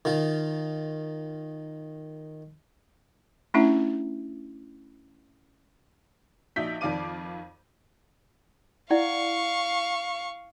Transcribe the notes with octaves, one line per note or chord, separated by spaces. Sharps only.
D#3 F4
A3 C#4 D4 E4 E5
A#1 D#4 F#4 E5 G6 B6
F2 D#3 D5 F5 D6 D#7
E4 D5 F5 F#5 C#6